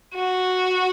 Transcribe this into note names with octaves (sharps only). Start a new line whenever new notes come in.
F#4